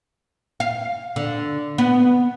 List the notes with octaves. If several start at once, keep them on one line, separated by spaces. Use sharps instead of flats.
F5
D3
B3